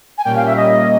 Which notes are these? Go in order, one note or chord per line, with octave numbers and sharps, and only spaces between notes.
G#5
A#2 G3 A#3 C#4 G5
F5
E5
D#5